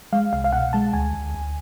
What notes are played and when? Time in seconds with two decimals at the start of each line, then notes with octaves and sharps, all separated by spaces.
0.13 G#3 F5
0.33 C2 F5
0.44 F5
0.53 B2 F#5
0.73 G#3 A5
0.93 D2 G#5
1.13 D2
1.35 D2